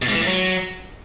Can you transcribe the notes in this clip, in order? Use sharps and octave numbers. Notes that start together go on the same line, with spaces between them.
B2
G#2
E3
A2
F#3